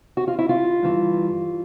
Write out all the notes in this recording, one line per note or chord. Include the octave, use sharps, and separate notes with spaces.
F#4
F4
E4
F4
G2 E3